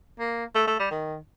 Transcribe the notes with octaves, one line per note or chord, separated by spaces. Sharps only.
A#3
A3
A3
G3
D#3